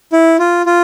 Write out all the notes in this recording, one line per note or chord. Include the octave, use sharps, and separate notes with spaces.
E4
F4
F4